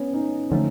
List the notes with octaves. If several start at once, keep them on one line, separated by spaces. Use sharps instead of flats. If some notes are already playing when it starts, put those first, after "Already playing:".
Already playing: B3 C#4
C#4 D#4
D3 F3 A3 C#4 D#4